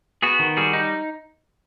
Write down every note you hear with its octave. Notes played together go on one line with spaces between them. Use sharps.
B3 F#4 G#4
D#3
G3 F#4 G#4
D#4